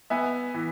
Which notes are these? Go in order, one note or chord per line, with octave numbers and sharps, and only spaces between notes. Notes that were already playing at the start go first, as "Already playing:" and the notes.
B3 E5 G#5
E3